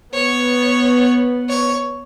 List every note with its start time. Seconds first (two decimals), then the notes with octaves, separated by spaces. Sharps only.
0.14 B3 C#5
1.49 C#5